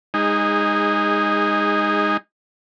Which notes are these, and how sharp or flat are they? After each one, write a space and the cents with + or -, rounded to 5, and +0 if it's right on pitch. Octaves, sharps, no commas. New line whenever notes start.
G#3 -15 D#4 +0 G#4 -30